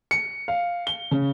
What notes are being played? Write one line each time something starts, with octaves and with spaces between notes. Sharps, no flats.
C#7
F5
G7
C#3